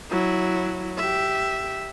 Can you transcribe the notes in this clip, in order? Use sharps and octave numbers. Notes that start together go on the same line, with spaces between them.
F#3 E4
G4 E5